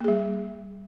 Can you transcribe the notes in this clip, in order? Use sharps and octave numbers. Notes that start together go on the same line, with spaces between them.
G3 A#3 G#4